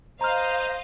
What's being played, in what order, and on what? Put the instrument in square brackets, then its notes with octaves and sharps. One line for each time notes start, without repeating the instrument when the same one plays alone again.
[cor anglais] C5 [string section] D#5 F5 [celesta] A#5 F6